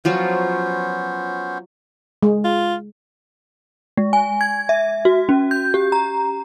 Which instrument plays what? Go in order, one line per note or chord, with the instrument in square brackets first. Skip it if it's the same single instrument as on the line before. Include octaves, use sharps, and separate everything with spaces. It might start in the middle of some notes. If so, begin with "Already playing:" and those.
[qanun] F3 F#3 F4 [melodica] B3 C#4 C5
[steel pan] G#3
[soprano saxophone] F4
[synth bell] G#3
G#5
G#6
E5
F#4
C#4
G6
G4
A#5